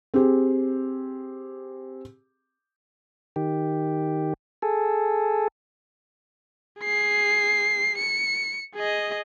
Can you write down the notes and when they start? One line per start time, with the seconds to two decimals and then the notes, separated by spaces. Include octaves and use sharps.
0.14 C4 G4 G#4
3.36 D#3 G4
4.62 G#4 A4
6.80 G#4 C7
7.98 C#7
8.75 G#4 D#5